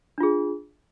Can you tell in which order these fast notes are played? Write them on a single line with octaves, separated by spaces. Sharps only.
D4 F4 G#4